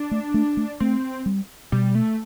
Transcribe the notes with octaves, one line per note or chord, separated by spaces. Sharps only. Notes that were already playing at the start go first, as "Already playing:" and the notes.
Already playing: D4
A3
A3
A3
A3 C4
G3
B2 G3
A3